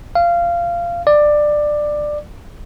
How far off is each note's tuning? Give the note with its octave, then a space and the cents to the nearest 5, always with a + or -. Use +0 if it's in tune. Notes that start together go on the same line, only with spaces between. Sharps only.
F5 -20
D5 +15